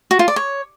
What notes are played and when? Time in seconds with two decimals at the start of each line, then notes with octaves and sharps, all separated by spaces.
0.11 F#4
0.19 F4
0.28 D5
0.36 C#5